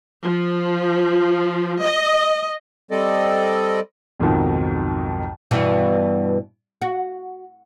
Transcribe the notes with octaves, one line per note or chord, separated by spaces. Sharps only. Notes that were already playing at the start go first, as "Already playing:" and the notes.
F3
D#5
G3 C4 A4 D5 D#5
B1 F2 G#2 B2 D#3 F3
G2 B2 E3
F#4